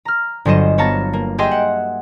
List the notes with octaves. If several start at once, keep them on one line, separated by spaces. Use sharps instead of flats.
A#5 F6
G1 F#3 C5 D#5 E7
B3 C#5 F5 A5 A#5
A#3
G4 G#4 D#5 E5 G5 C6
F#5